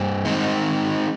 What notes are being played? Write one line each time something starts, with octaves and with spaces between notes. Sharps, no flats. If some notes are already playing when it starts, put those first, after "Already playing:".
Already playing: G2 C5
D#3 G#3 C4 D#4